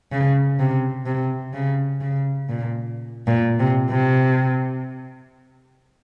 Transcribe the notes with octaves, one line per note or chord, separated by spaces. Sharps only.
C#3
C3
C3
C#3
C#3
A#2
A#2
C3
C3